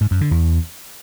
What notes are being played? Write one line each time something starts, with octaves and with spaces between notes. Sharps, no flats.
G#2
F#2
D3
E2